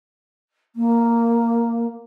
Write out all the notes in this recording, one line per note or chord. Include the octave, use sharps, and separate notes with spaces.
A#3